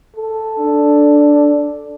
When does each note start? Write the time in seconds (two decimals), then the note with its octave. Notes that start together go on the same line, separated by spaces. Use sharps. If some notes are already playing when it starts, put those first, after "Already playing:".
0.16 A4
0.59 D4